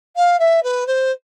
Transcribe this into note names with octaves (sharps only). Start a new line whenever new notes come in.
F5
E5
B4
C5